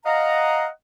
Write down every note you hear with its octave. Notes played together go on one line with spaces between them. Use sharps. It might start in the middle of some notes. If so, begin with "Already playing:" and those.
D#5 F5 F#5 A#5